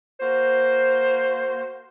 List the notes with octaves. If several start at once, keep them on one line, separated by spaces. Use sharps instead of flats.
A#3 F#4 C5